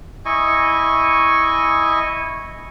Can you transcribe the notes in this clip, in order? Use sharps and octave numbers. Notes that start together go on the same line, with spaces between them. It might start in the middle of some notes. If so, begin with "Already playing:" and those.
E4 D#5 G#5 C#6